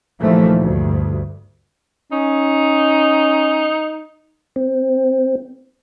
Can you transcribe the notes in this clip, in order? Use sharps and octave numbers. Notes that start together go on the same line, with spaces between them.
D#2 A#2 E3 F3 A3
D2 G2
C#4 D#4
C4